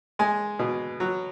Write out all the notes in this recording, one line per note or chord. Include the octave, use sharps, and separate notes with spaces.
G#3 G#5
B2
F#3